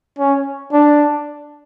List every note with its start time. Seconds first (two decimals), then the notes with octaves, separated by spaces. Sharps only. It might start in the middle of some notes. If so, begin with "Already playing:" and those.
0.19 C#4
0.72 D4